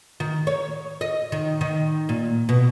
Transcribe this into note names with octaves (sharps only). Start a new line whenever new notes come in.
D#3
C#5
D#5
D#3
D#3
A#2
B2